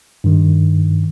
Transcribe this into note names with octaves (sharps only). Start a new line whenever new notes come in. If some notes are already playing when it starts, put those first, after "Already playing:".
G2 D#3